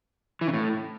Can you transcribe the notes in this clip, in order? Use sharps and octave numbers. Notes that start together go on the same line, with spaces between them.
E3
C#3
A2